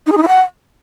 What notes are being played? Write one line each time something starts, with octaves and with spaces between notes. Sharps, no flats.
D#4
G#4
D#4
E4
F#5